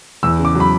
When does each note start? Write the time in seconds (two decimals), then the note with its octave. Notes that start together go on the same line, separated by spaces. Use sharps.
0.23 E2 E6
0.39 C#3
0.45 D6
0.55 F#3
0.60 B5